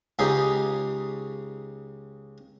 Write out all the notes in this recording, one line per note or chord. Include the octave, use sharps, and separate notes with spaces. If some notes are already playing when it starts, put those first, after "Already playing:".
C#2 C#3 D#4 G4 G#4